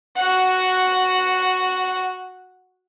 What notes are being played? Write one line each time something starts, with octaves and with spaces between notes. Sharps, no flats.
F#4 F#5